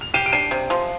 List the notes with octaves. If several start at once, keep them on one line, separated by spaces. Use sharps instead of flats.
F7
G4 C7 D#7
D7
D4 C7 D#7
C3
F3